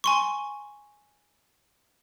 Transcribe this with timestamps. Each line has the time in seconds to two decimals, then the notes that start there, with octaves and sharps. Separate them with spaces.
0.04 G#5 C6 C#6